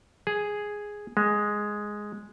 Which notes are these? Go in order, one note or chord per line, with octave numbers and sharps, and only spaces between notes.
G#4
G#3